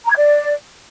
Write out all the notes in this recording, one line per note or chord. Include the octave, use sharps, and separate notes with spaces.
A#5
G#6
D5